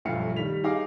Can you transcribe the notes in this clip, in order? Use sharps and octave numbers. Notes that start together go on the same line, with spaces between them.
B1 G2 F3 A3 F5 C#7
D#3 G3 B6 F7
D#4 G#4 F5 D6